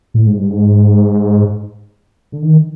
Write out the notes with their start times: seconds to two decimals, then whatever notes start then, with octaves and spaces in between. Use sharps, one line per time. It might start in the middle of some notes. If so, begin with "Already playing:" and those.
0.14 A2
0.26 G#2
0.38 G2
0.50 G#2
2.32 D3
2.42 D#3